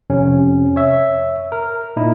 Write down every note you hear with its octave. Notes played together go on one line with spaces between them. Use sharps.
F2 C3 C#4
C#5 E5
A#4
A#2 D#4 E4